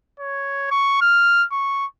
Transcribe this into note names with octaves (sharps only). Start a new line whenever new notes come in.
C#5
C#6
F6
C#6